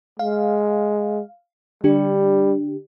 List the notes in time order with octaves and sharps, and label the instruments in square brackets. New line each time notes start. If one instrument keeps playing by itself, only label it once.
[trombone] G#3 [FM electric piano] F5
[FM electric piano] D3 D4 G4 [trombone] G3